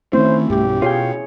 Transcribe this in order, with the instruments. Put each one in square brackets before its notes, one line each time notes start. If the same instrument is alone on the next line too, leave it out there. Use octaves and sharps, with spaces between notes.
[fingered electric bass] D#3 C4 [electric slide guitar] A3 [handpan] C#4 E4 [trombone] C5
[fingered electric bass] B1 G2 B2 [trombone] G4
[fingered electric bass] B2 [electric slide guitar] F4 F5 G5 [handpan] G#4 C#5